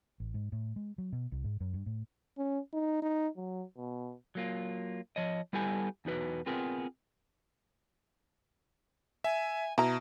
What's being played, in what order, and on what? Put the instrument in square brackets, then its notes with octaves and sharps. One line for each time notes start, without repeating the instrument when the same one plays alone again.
[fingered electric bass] A1
G#2
A2
G#3
F#3
B2
C2
G#2
F#2
G2
A2
[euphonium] C#4
D#4
D#4
F#3
B2
[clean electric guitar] F#3 A#3 F4
F3 C#5 D#5
G3 B3 E4 G4 A4 G#5
E2 D#4 F#4 B4
B3 C4 F4 G#4 A#4 B4
[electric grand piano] E5 [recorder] G#5
[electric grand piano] B2 [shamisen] E4 A#5